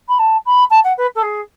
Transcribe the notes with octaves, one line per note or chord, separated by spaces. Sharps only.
B5
A5
B5
A5
F#5
B4
A4
G#4